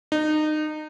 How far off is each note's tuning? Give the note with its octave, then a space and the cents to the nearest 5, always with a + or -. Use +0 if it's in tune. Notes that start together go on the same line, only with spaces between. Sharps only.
D#4 -25